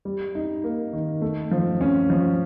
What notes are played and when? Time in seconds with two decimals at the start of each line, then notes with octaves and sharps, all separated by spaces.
0.05 G3
0.35 D#4
0.64 A#3
0.93 D#3
1.22 A3
1.51 F3
1.81 C#4
2.10 F3